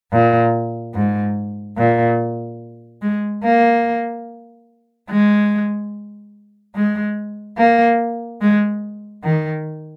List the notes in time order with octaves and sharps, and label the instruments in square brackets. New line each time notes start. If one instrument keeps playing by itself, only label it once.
[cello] A#2
G#2
A#2
G#3
A#3
G#3
G#3
A#3
G#3
D#3